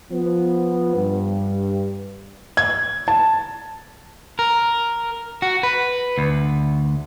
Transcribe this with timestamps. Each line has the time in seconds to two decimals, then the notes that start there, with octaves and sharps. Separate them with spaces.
0.11 F3 B3
0.94 G2
2.57 G#6
3.08 A5
4.39 A#4
5.42 F#4
5.63 B4
6.18 D2